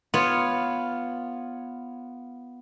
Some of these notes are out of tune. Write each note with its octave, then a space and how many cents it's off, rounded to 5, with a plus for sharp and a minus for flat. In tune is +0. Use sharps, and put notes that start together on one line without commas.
B3 +0 F4 +0 C#5 +0